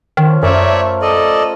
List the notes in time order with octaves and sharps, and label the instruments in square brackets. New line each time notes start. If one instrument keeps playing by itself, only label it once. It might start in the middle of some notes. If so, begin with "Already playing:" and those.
[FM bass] D#3 [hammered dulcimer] F3 C#4
[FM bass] F#2 [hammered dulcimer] F3 A3 A#4 [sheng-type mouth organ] C#5 D5 E5
[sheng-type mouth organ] A4 D5 D#5